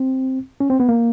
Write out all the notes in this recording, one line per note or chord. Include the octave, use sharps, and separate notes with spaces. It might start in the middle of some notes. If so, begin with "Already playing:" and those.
Already playing: C4
C#4
C4
B3
A#3